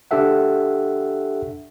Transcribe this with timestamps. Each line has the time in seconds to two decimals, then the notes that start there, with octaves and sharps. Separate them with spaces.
0.11 D4 G4 A4 E5 F#5